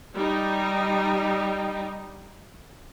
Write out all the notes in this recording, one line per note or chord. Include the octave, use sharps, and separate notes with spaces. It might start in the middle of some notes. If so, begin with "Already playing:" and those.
G3 D#4